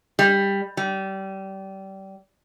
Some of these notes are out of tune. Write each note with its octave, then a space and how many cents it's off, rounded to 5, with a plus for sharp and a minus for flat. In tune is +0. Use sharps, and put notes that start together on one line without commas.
G3 +15
G3 -25